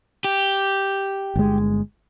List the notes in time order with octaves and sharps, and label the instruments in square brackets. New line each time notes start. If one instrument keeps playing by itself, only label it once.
[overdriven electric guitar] G4
[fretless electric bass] G1 G#3